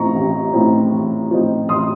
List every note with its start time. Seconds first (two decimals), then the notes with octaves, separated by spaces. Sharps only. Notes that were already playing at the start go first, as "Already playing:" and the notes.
Already playing: A1 A2 F3 C4 D#4 A#5 C#6
0.15 A1
0.53 A2 F3 C4 D#4
0.92 A1
1.31 A2 F3 C4 D#4
1.69 A1 C6 D#6